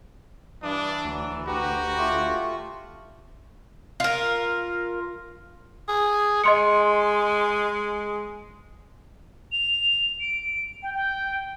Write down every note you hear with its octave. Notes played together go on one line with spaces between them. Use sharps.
G2 E3 D4 D#6
D2 F#3
F#4 G4 B4 A#5
A3 F4 C#6
F4 A#4
G#4
G#3 D#5 C6 C#7
F7
D7
G5
G5